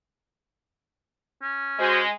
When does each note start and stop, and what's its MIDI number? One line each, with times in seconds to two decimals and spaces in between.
1.42 2.01 61
1.79 2.11 56
1.79 2.02 66
1.79 2.02 72